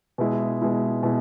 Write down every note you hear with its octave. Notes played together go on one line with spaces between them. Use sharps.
B2 G#3 E4
B2 G#3 E4
B2 G#3 E4